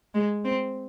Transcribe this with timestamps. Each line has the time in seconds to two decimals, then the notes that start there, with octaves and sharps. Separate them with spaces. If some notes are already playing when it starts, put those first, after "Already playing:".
0.14 G#3
0.45 C4